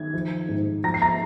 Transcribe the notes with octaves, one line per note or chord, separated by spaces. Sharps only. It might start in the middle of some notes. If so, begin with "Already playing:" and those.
Already playing: D#3 G#6
F3
G#2
F3 A#5 A#6
C7
A#5 A#6